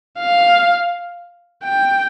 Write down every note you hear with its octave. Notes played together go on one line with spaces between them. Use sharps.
F5
G5